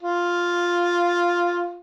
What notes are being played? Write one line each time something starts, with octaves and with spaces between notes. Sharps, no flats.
F4